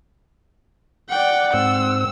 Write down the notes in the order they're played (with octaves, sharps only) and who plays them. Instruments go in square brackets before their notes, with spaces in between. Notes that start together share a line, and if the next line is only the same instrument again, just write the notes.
[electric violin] D5 G5 [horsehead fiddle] F#5
[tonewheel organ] G#2 C4 [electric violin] E6